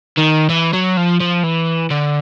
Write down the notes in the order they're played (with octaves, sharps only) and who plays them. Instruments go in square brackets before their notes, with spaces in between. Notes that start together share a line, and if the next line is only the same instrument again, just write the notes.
[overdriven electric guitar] D#3
E3
F#3
F3
F3
E3
D3